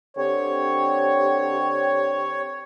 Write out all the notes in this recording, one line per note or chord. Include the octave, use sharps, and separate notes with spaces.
D3 C4 G4 C#5